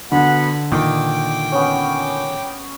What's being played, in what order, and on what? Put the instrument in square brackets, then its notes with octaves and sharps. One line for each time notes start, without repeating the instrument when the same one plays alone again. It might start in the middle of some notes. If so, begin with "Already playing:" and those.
[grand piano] D3 [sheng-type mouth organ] B3 F#4 B5
[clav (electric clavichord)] A#2 D#3 [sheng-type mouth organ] G5 D6
[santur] B3 C#4